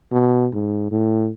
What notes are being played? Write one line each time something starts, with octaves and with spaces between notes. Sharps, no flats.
B2
G#2
A2